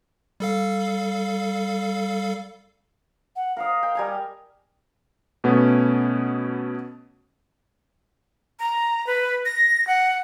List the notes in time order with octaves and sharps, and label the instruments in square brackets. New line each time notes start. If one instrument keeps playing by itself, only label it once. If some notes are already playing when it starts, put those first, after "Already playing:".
[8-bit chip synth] G3 A4 F5
[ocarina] F#5
[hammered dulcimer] A#4 D#5 [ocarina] F5
[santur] G5
G3 G#5 A#5
[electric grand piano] B2 A3 B3 C#4
[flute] A#5
B4
A#6
F#5